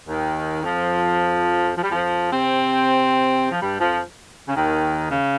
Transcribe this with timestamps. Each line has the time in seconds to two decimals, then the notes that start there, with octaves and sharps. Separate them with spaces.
0.07 D#2 D#3
0.63 F2 F3
1.76 F3
1.84 G3
1.91 F2 F3
2.31 C3 C4
3.52 F3
3.62 G2 G3
3.80 F2 F3
4.47 C#3
4.56 D#2 D#3
5.11 C#3